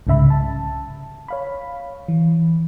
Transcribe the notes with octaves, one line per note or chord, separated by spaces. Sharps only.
C2 G#2 C#3 E5 B5
A5
C#5 F5 B5
E3